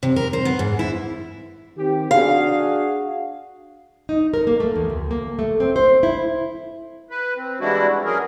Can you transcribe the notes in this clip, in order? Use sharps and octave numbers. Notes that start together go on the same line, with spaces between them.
C3
A#4
C5
B3
G#2
E4
D#3 C4 G4
D4 F#4 G#4 F5
D#4
A#4
A#3
A3
E2
D2
A#3
A3
C4
C5
E4
B4
C4
E3 G3 G#3 D4 E4 F#4
F2
F#3 C#4 G#4 A#4